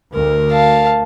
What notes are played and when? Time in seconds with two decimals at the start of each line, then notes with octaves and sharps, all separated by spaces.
0.14 D2 A#4
0.51 F5 A5